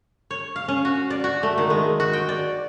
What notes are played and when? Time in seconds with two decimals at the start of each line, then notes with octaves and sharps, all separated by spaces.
0.31 C#5
0.56 F5
0.68 C#4
0.85 F#4
1.10 D5
1.24 F#4
1.43 A3
1.58 D#3
1.70 G#3
2.00 F#4
2.13 G5
2.29 D5